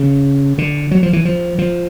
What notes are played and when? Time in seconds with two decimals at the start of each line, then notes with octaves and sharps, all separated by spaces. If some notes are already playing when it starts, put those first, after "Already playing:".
Already playing: C#3
0.58 D3
0.91 F#3
1.03 F3
1.13 E3
1.25 F3
1.58 F3